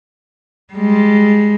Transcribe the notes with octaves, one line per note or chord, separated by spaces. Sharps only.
G3 G#3